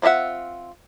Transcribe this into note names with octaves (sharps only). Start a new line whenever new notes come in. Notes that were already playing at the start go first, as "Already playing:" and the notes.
C4 F4 D#5 E5 F#5